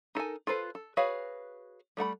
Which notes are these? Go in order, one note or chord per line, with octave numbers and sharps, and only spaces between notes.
D#4 A4 A#4 G#5
F4 A4 B4 C5
A4
F#4 G#4 B4 C#5 F5
G3 A3 F#5 B5